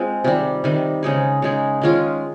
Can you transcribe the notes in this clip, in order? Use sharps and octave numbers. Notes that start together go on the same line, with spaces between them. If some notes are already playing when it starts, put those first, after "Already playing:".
Already playing: G#3 C4 F4
C3 D#3 G3
C3 D#3 G3
C#3 G#3 D#4 G#4
C#3 G#3 D#4 G#4
D#3 G#3 C#4 F4